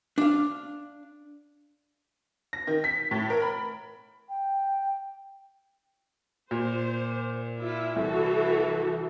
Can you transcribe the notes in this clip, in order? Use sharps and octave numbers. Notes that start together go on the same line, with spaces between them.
D4 F5
A#6
D#3
B6
A2
A#4
B5
G5
A#2 C5
E4 F4
C2 E3 F#4 A4